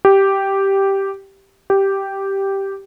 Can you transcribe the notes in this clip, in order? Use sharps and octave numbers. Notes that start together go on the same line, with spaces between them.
G4
G4